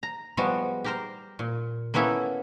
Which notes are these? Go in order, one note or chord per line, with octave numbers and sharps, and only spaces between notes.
A#5
F3 G3 G#3 B3 F#4
G4 A#4 C5
A#2
A#3 B3 C#4 E4 A4